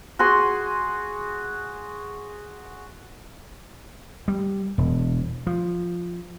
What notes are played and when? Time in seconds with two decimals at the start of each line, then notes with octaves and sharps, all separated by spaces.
0.19 F#4 G#4 C6
4.28 G3
4.78 E1
5.47 F3